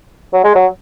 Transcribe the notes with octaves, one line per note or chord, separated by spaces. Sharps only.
F#3
G#3
F#3